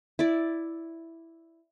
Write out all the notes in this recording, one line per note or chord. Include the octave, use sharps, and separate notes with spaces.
E4 D5